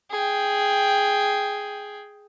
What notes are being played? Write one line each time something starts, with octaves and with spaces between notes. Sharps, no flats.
G#4 G5